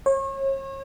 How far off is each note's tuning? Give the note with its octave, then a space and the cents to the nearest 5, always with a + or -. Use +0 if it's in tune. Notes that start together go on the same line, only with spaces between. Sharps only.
C#5 -35